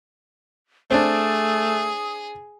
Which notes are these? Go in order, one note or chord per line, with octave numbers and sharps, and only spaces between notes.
A3 C4 D4 G#4 D#6